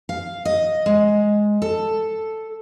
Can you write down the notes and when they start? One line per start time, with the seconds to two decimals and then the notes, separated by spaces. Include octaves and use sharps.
0.09 F5
0.45 D#5
0.86 G#3
1.62 A4